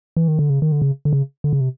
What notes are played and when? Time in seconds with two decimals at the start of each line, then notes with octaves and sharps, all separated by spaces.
0.17 E3
0.28 D#3
0.39 D3
0.50 C#3
0.62 D#3
0.72 D3
0.82 C#3
1.05 D3
1.13 C#3
1.44 D3
1.53 C#3
1.61 C3